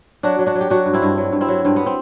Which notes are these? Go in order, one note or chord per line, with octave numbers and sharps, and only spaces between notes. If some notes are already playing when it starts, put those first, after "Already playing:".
F#3 D4 F#4
F#3
D4 F#4
F#3
G4
F#3 D4 F#4
G2
C4 E4
G2
F#3
G2
C4 E4
F#3
G2 C4
B3
C4